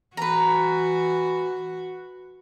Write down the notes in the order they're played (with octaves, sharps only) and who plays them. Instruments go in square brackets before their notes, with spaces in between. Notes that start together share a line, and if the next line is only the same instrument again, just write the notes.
[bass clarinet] E3 [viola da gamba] F#4 [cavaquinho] B4 A#5